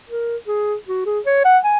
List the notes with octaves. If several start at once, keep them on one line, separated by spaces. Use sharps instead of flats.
A#4
G#4
F#4
G#4
C#5
F#5
G#5